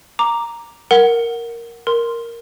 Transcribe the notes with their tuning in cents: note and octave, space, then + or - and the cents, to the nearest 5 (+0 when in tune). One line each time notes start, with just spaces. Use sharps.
A#5 +0 D6 +0
A#4 +0 F#5 +0
A#4 +0 C6 +0